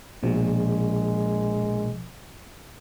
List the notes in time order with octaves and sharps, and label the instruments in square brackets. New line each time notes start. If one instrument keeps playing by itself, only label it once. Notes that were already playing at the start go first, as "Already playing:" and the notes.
[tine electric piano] A#1 [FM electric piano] B2 F3 [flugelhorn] G#3